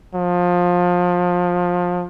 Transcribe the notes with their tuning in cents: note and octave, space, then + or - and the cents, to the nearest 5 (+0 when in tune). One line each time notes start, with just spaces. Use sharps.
F3 +25